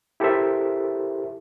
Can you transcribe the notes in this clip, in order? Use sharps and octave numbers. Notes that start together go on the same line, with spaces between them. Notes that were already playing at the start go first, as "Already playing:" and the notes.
E4 G4 A4 A#4 C5 E5